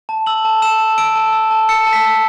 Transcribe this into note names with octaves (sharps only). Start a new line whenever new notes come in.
A5
E6 F#7
A5
E6 E7
A5
E6 D7
A5
E6
A5
E6 C#7
A5
B6
E6